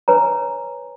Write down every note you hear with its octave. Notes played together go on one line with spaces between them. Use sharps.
B4 C#5 G#5 A#5